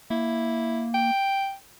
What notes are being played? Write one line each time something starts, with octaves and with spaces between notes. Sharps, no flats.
A#3 E4
G5